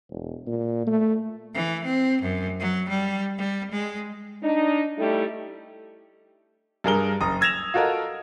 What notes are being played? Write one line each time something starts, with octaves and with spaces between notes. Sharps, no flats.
E1
A#2
A3
E3
C4
F#2
F#3
G3
G3
G#3
D4 D#4
G3 A3 D#4 E4 G4 A4
G2 G#4 A#4 G7
F#1 A#5 D#6
E6 G#6 A#6 E7 F7
F4 F#4 A4 A#4 D#5